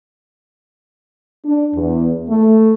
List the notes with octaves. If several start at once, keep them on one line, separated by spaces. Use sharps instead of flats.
D4
E2
A3